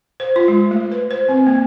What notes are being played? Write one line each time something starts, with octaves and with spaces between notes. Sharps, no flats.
C5
F4
G#3
A3
B4
C5
C4
A#3